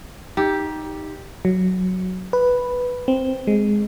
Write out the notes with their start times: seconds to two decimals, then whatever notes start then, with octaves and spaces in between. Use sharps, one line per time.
0.37 D#4 G4
1.45 F#3
2.33 B4
3.08 C4
3.47 G#3